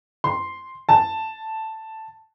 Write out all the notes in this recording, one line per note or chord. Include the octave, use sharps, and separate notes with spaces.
C6
A5